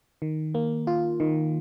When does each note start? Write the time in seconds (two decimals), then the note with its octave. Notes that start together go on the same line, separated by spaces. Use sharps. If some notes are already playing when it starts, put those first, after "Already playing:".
0.22 D#3
0.55 A#3
0.87 F4
1.20 D#3